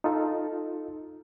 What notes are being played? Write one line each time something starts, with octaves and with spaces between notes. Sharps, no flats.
D#4 F4 A4